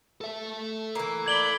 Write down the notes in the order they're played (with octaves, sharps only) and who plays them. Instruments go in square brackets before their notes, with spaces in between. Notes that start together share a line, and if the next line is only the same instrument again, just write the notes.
[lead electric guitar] A4 E5
[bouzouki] E3 A#3
[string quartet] D5 B5 [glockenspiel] G#6 F#7 G7